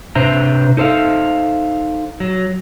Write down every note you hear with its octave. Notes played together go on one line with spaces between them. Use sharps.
C3 D4 B4 C5 E5 A#5
D#4 A4 C5 E5 F5
F#3